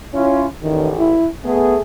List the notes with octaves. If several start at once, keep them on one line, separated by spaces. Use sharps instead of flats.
C#4 E4 F4
A1 E2 D#3
E4
A3 B3 G#4